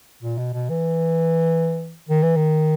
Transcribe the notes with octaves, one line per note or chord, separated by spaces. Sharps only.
A#2
B2
B2
E3
D#3
E3
D#3